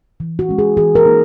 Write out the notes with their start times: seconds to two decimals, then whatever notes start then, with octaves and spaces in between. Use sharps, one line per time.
0.20 E3
0.39 F#4
0.49 G#3 C#4
0.58 G#4
0.77 E3 G#4
0.95 A#4
1.05 A#3 D#4